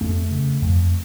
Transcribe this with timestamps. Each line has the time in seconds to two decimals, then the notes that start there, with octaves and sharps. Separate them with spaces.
0.01 F2 A3
0.31 C#3
0.62 F2